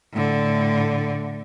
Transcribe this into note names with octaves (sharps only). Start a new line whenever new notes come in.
A2 D3